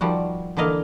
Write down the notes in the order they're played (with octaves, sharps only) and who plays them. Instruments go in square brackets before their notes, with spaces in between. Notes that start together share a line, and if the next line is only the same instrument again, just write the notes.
[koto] D#3 F3 G3 F#4
D3 E3 A#3 D#5 F5